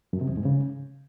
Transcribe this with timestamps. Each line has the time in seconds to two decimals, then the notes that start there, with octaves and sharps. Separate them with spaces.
0.13 F#2
0.21 C3
0.29 E2
0.37 G#2
0.45 C#3